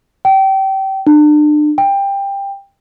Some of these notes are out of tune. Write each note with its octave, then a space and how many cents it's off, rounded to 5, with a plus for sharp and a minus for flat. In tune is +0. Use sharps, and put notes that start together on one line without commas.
G5 -25
D4 +35
G5 +15